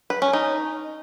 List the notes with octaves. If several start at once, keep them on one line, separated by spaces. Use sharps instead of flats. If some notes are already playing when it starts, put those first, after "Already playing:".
B4
C#4
D#4